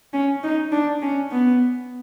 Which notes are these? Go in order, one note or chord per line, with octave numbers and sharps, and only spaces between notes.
C#4
D#4
D4
C#4
B3